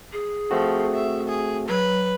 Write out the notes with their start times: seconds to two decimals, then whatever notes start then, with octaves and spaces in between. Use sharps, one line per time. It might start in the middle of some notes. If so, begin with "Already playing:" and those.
0.13 G#4
0.51 F3 A3 C4 F#4
0.94 E5
1.28 G#4
1.68 F#3 B4